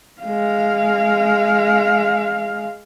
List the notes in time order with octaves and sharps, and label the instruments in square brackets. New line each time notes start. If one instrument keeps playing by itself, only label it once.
[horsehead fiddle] G#3 F5